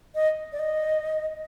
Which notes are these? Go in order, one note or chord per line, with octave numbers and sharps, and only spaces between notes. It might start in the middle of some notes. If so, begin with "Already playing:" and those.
D#5
D5
D#5